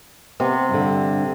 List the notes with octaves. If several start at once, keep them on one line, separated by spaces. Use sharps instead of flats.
C3 B3
G2 D3